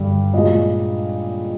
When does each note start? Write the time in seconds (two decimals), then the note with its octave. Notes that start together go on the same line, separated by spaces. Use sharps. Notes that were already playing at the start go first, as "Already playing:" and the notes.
Already playing: G2 D3 G3
0.33 A#2 G#3 D#5